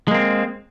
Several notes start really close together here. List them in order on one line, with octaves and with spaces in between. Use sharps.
G#3 A#3 C4